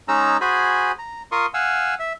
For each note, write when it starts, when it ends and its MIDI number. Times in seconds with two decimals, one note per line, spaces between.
0.08 0.37 56
0.08 0.37 61
0.08 0.37 63
0.08 0.37 82
0.08 0.37 88
0.41 0.92 66
0.41 0.92 68
0.41 0.92 72
0.41 0.92 80
0.41 0.92 83
0.99 1.22 82
1.32 1.46 65
1.32 1.46 70
1.32 1.46 84
1.32 1.46 85
1.32 1.46 87
1.54 1.94 77
1.54 1.94 78
1.54 1.94 80
1.54 1.94 88
1.99 2.13 76